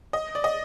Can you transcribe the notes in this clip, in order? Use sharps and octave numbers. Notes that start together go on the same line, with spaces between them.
D#5
D5
D#5